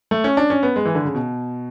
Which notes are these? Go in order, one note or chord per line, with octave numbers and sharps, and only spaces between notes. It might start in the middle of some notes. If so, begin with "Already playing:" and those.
A3
C#4
D4
C#4
B3
G#3
E3
D3
C#3
B2